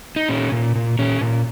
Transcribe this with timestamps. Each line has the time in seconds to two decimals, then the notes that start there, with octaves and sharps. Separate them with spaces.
0.16 D#4
0.29 A#2 C#4
0.52 A#2
0.75 A#2
0.99 A#2 C#4
1.21 A#2